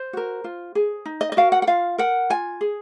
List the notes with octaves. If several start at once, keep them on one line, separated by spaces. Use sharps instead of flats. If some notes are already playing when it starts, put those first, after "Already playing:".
Already playing: C5
F#4 A#4
F4
G#4
D#4
D#5
D#5
F#4 A#4 F5
F#5
F#5
F4 F5
A#4 F#5
F4 G#5
G#4